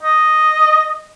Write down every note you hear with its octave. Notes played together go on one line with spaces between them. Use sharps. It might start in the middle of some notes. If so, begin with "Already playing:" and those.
D#5